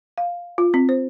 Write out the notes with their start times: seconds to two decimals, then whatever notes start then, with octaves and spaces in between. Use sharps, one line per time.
0.18 F5
0.58 F4
0.74 C4
0.89 C5